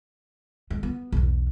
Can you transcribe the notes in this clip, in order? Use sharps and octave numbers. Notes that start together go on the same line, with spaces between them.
G#3
B3
B1 E2